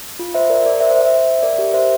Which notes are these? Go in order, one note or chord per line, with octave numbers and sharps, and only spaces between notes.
F4
C5 E5
A#4 D5
A#4 D5
C5 E5
C5 E5
C5 E5
E5
A#4 D5
G4 A#4
C5 E5